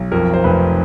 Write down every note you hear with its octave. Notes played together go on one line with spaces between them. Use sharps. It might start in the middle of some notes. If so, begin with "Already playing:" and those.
Already playing: B1
F2 A#4
C5
F1 B4